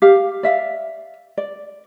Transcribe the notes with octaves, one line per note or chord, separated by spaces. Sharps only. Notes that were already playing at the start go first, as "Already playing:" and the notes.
G4 F5
D5 E5 F5
D5